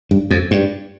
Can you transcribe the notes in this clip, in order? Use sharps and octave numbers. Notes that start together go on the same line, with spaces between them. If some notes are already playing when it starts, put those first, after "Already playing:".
G2
F2
G2